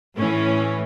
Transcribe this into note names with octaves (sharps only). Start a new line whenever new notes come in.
A2 E3 C#4